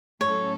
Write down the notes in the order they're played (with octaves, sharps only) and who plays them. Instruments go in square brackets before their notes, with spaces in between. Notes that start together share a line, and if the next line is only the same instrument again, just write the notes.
[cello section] A2 F#3 C#4 A4 [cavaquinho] C#5